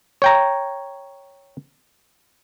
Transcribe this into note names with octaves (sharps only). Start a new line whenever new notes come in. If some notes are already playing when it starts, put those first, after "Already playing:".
C#5 G5 A#5